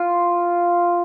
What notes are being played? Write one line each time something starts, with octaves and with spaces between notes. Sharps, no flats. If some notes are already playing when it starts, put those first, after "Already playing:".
Already playing: F4